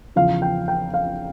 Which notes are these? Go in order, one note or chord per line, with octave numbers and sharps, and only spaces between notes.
E2 C#3 F3 F5
G5
G5
F5